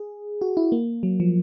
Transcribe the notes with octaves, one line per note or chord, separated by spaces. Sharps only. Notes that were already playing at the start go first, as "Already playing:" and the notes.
Already playing: G#4
F#4
E4
A#3
F#3
F3